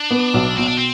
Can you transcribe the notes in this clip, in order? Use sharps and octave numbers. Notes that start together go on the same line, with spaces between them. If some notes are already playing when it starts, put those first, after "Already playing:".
Already playing: D4
B3
B1
B2 C4
D4
C4